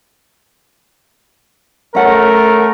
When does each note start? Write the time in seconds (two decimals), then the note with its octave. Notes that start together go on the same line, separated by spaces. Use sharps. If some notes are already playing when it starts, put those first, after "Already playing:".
1.95 A3 C#4 A#4 F#5